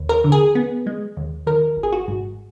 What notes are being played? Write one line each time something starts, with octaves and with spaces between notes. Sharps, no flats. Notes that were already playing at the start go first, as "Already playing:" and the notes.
Already playing: D#2
A#4
D3
G#4
B3
G#3
D#2
D#3 A#4
G#1
G#4
F#4
G#2